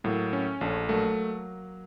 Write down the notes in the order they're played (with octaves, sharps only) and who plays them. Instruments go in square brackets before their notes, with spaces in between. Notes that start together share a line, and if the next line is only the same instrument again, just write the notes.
[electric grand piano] A2 [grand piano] F#3 A#3
[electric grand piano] C#4
[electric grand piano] A#1 [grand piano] F3 A3
[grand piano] F#3 A#3 [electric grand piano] A3